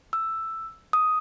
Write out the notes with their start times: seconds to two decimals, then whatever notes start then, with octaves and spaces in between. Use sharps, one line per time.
0.13 E6
0.93 D#6